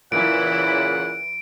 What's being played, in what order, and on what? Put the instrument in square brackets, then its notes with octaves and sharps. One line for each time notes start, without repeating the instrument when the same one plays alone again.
[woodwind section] A#2 C#3 [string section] E3 E4 [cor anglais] F#5 [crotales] D7